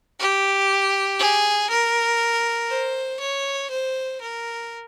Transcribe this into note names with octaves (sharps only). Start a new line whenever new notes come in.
G4
G#4
A#4
C5
C#5
C5
A#4